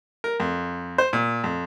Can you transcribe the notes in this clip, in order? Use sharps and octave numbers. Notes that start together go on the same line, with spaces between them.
A#4
F2
C5
A#2
F2